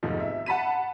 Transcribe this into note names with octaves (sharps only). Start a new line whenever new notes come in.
F1 B1 G#2 F3
E5
F#5 A5 B5 B6 D#7